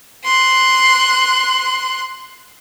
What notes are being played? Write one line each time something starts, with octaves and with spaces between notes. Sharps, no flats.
C6 F#6